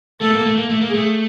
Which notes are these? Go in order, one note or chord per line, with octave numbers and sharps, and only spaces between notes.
A3 A4
A#3
A3
A#3
A3
A#3
G#4
A3